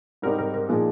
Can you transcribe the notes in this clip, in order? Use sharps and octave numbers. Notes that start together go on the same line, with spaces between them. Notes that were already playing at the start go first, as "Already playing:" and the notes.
G#2 G3 C4 D#4 A#4
A#4
A#4
A#2 F3 G#3 D#4 G#4